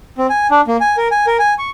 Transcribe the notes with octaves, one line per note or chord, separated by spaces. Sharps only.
C4
G#5
D4
A#3
G#5
A#4
G#5
A#4
G#5
C#6